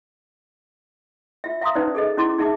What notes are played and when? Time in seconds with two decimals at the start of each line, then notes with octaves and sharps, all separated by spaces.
1.44 F4 E5
1.61 E5 F5 A#5 C6 D#6
1.75 C#4 D#4 B4 C5 D5
1.95 G#4 A4 D#5
2.17 C#4 E4 C6 D6
2.38 D#4 G#4 E5 A5 D6